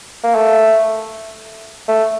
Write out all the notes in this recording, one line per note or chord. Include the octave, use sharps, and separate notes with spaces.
A#3
A3
A3